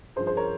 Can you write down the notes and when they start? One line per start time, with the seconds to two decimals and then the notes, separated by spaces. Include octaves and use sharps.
0.16 G2 F3 G#4 C5
0.26 G#4 C5
0.37 A#4 C#5